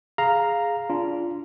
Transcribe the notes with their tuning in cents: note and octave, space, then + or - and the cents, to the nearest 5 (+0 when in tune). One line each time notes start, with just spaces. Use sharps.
G#4 +0 F5 +0 A#5 +0
D4 -20 F4 -20